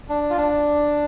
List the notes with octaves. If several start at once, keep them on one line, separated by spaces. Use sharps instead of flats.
D4
F4
D4